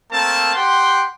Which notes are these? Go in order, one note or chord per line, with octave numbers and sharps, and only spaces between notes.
A3 A#3 C4 A#4 A5
G4 F#5 G5 C6